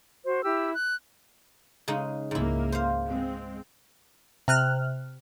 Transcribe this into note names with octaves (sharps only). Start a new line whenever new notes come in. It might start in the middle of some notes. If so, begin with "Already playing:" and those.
F#4 C5
E4 G4 E6
F#6
C#3 G#3 D#4
C#2 G#2 A#3 E4
C5 F5
G#3 C4
C3 F6 F#6